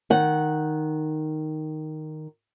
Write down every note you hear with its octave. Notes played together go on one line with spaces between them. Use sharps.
D#3 F#5